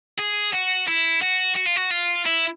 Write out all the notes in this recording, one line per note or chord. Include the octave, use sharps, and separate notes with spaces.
G#4
F#4
E4
F#4
F#4
F4
F#4
F4
E4